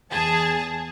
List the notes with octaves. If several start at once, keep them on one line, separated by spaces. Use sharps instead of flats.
E2 G#4 A5